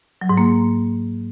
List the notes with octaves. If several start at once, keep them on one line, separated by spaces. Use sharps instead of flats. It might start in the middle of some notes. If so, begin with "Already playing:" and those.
F#3
G#2
A#3